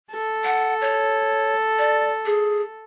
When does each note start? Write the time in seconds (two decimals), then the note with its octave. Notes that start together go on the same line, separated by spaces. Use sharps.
0.11 A4
0.44 F#5
0.81 C#5
1.79 D5
2.26 G#4